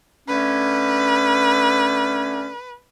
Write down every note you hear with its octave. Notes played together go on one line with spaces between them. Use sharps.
D3 A3 C#4 B4